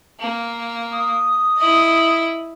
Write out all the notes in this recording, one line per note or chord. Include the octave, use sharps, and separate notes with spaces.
A#3
D#6
E4 D#5